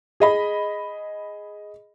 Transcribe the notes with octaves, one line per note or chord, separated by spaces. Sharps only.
G#4 D#5 B5